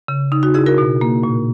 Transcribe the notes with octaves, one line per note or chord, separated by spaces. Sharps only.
C#3
C#3 D#4
D#4 F#4
C#3 E4 G#4
F#4 A#4
B2
A#3
A#2